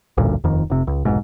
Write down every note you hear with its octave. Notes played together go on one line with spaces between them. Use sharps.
A1 D2 G2 A#2
D#1 F2 D#3
F1 C3
C#2
F1 B1 G#2